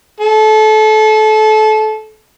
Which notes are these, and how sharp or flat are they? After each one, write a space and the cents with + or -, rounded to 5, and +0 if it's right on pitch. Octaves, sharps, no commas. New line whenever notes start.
A4 -25